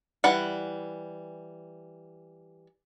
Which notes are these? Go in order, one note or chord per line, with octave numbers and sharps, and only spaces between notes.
E3 G3 F#5